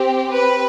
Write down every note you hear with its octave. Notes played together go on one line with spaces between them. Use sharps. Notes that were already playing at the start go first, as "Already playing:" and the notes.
Already playing: C4 G4
B4